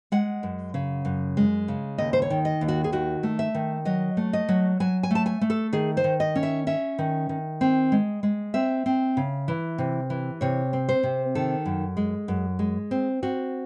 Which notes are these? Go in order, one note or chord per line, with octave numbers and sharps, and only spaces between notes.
G#3 F#5
F#2
C#3
F#2
G#3
C#3
D#2 D#5
C5
C#5
D#3
D#5
D#2
F#4
G#4
D#3 F#4
A3
E5
D#3
F#3 D#5
A3
D#5
F#3
F#3 G#5
G#5
A3 A5
G#5
A3
A4
D#3 G#4
C5
D#3
D#5
C#4
E5
C#4 E5
D#3
D#3
C4
G#3
G#3
C4 E5
C4
C#3
E3
C3
E3
C3 C#5
C4
C5
C3
D#3 A4
F#2
G#3
F#2
G#3
C4
C4 F#4